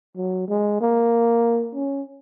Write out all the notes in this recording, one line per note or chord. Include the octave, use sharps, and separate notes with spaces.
F#3
G#3
A#3
C#4